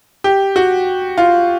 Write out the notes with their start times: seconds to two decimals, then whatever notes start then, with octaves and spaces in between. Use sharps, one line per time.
0.24 G4
0.56 F#4
1.18 F4